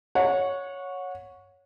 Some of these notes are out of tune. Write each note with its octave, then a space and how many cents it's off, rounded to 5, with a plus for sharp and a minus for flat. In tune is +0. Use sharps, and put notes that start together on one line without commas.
C#5 +0 F#5 -25